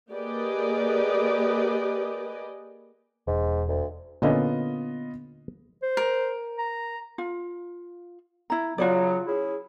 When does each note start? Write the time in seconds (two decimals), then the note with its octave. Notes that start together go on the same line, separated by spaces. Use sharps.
0.10 A#3 G4 G#4 B4 D5 D#5
3.27 E1 G#2
3.68 D2
4.22 A#2 D3 B3 C#4 F4 D#5
5.83 C5
5.97 A#4
6.59 A#5
7.18 F4
8.50 E4 A#5
8.78 C#3 F#3 F4 F#4 D5
9.27 C#4 E4 G#4